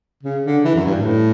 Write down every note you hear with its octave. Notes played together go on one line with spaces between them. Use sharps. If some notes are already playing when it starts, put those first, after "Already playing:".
C#3
D3
E3
F#2
G2
A2